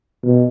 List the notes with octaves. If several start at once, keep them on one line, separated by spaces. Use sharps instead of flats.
B2